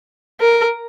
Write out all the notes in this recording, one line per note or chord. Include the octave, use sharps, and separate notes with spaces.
A#4